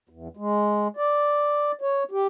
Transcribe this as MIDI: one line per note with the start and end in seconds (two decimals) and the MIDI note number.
0.09 0.28 40
0.37 0.88 56
0.97 1.72 74
1.81 2.04 73
2.11 2.27 67